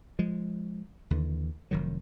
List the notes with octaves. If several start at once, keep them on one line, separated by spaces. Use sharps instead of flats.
F3 G#3
D#2 D3 E3
F1 D#3 F#3